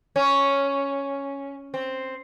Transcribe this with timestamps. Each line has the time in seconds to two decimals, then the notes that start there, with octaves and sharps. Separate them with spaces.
0.16 C#4
1.74 C4